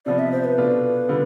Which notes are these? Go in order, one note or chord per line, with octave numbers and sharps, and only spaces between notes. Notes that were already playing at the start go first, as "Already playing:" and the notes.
C3 F3 B3 D5
E5
C5
B4
B2 A3 D4 F4
D3 G3 B3 F4